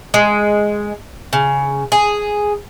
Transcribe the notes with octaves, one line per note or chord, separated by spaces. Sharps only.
G#3
C#3
G#4